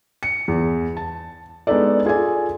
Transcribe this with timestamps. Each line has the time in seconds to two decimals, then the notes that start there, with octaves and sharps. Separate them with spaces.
0.23 C#7
0.48 E2
0.97 A5
1.67 G#3 B3 D4 D#4 A4 D5
2.05 F4 G#4 A4 D5 G#5